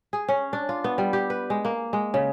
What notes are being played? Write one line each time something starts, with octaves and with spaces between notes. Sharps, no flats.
G#4
C#4
D4
F4
B3
G3
G4
B4
G#3
A#3
G#3
C#3